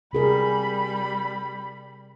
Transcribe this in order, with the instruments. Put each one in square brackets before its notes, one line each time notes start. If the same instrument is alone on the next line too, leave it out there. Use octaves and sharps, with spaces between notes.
[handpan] C3 G#4 A#4 [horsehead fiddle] G3 B5